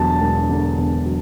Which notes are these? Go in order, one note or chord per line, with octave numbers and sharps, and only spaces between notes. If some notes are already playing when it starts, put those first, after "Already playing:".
Already playing: E1 E2 D3 F#3 A5
E1
D3
E2
F#3